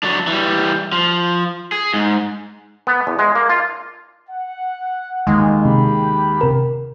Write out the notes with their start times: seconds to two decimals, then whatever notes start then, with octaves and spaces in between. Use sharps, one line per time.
0.03 F#3 D4
0.27 E3 G3
0.92 F3
1.72 G#4
1.94 G#2
2.87 B3
3.07 E2
3.19 G#3
3.35 A#3
3.50 F4
4.30 F#5
5.27 D#2 G#3
5.65 C3 G4 B5
6.41 C3 A#4